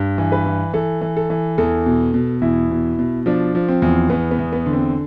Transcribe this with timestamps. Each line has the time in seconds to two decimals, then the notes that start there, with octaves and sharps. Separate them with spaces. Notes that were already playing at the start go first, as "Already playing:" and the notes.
Already playing: G2
0.18 E3
0.32 B4
0.46 E3
0.73 E3 A4
1.01 E3
1.17 A4
1.30 E3
1.58 E2 A4
1.86 B2
2.14 B2
2.41 E2 E4
2.71 B2
2.99 B2
3.26 F3 D4
3.55 F3
3.68 C4
3.82 E2
4.10 E2 B3
4.31 B3
4.39 E2
4.53 B3
4.66 D3
4.73 C4